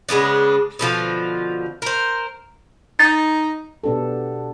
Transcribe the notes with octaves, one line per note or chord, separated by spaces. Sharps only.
C#3 G#3 B3 D4
B2 D3 F3 F4
A#4 C5
D#4 A6
B2 B3 D4 G4 A4